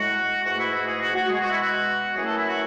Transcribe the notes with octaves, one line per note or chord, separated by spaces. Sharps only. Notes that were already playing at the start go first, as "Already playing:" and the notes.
Already playing: A2 G#3 F#4
G#2 E3 A3 F#4
E4
F#4
G#4
F#4
F#4
B2 G#3 G#4
F#4
E4
F#4
F#2 E3 A3 G#4
A4
E4
F#4